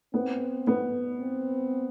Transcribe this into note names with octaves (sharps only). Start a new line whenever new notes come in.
B3 C4
B3
C4